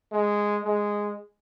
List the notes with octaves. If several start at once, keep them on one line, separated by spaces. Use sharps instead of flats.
G#3
G#3